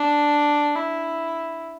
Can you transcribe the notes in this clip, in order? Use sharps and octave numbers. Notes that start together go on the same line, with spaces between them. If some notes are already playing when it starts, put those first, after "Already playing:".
Already playing: D4
E4